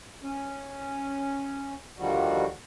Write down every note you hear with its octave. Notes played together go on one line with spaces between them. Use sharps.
C#4
D#2 D3 D#3 F3 G3 F#4